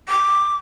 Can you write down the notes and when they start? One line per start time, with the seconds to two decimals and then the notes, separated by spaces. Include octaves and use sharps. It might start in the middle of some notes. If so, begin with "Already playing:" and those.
0.08 D6